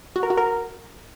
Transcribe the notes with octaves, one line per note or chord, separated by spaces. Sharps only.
F#4
A#4
F#4
A#4